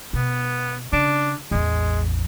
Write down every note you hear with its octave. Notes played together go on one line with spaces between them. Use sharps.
B2 B3
C#3 D4
A1 E2 G#3